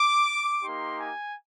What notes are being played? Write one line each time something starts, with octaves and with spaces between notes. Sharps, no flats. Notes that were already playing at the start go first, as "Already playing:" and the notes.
Already playing: D6
A#3 D#4 G4 C6
G#5